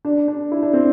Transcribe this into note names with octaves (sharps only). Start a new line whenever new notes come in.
D4
D4
E4
D4
C4